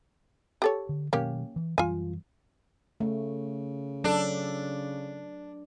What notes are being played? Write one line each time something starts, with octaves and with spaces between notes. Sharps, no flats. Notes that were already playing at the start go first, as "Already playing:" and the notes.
G4 A4 C#5
D3
B2 D#3 F#3 A#3 C#4 G4
E3
F#2 E3 G3 F4 G#5
C#3 A3
F#3 D4 A4